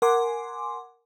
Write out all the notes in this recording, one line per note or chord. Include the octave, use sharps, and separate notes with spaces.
A#4 F#5 G#5 C6 D6